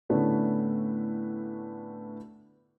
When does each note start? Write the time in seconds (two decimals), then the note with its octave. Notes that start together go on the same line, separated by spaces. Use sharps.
0.09 A2 D3 A3 B3 C#4 D4